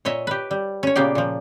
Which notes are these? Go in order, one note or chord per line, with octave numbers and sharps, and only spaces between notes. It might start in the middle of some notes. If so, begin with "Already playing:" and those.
A#2 C#5 D#5 E5
G4 B4
G3
C#4 C#5
A#2 C#3 A#3 B3 G4 D5
A#2 F3